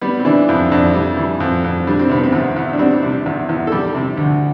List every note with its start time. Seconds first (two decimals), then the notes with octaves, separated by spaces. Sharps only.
0.01 G3 B3
0.19 C4
0.25 E3 D4
0.48 F2 E4
0.72 F2 D4
0.94 G3
1.17 E3
1.40 F2
1.64 F2
1.87 G3 D4
1.99 C4
2.09 C3 B3
2.23 C4
2.32 E2
2.56 E2
2.73 D4
2.79 G3 C4
3.03 C3
3.26 E2
3.49 E2
3.67 A4
3.72 G3 G4
3.94 C3
4.17 D2